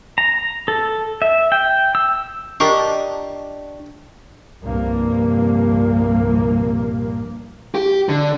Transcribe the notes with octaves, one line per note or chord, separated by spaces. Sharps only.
A#5
A4
E5
G5
E6
D4 F4 G4 A#4 D#5 C#6
C2 G2 A#2 F3 A#3
G4
D3